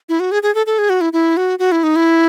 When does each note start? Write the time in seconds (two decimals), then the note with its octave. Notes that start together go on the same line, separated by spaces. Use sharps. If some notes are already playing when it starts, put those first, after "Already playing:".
0.09 E4
0.20 F#4
0.32 G#4
0.43 G#4
0.55 A4
0.66 A4
0.79 G#4
0.90 F#4
1.01 E4
1.13 E4
1.37 F#4
1.59 F#4
1.72 E4
1.83 D#4
1.96 E4